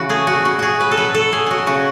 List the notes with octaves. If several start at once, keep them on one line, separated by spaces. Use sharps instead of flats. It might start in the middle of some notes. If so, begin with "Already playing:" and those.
Already playing: C#3 E3 F#4
A3 G#4
B2 F#4
B2 F#4
B2 F#4 G#4
F#3 B4
A4
F#3 B4
F#3 A4
B2 G#4
F#3 F#4 G#4
C#3 F#4